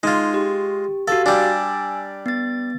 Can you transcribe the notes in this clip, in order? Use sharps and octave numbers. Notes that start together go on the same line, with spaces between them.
G#3 D#4 F4
G4
F#4 G4 A4 F5
G3 D4 G#5 E6
B3 A6